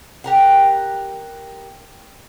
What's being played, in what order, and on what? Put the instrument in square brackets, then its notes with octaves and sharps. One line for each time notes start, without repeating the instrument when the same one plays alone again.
[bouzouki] G4 A#4 F#5